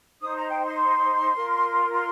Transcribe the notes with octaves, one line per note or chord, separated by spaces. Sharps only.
D#4 C5 D#6
A#5
G5
C6
F4 A#4
C6